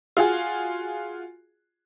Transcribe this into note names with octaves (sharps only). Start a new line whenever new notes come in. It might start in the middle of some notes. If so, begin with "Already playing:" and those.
F4 F#4 G#4